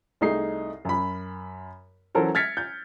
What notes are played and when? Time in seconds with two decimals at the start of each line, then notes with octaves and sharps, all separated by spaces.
0.21 C2 A3 D#4 G#4 C7
0.85 F#2 B5
2.15 E3 F#3 C#4 A4 A#4 C5
2.35 F6 G#6 A6 B6 C#7
2.57 G6